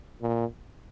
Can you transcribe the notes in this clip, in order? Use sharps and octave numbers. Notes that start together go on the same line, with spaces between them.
A#2